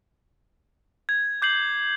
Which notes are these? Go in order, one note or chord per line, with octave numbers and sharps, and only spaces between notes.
G#6
D6 G6 C7 F#7